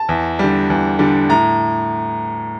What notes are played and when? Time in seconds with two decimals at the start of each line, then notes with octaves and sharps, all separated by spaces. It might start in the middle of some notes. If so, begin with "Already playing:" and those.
Already playing: A5
0.09 E2
0.39 D3 G3
0.70 E2
0.99 D3 G3
1.29 A2 A#5